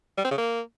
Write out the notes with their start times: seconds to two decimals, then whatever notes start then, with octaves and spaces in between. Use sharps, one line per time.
0.18 G3
0.24 C4
0.31 C#3
0.38 A#3